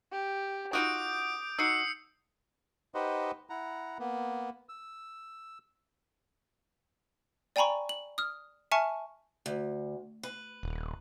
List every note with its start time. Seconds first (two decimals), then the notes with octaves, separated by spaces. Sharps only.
0.12 G4
0.73 D#4 F4 F#4 D6 D#6 G6 D7
1.59 D#4 F#4 E6 C7 C#7
2.95 D#4 G4 B4 C5 D#5 F#5
3.50 E4 F#5 A#5
3.99 A#3 B3
4.69 E6
7.56 D5 G5 G#5 A#5 B5 C#6
7.89 F#7
8.18 D#6 F6
8.71 E5 G#5 A5 C#6 F6 C#7
9.46 D2
10.23 B4
10.63 D#1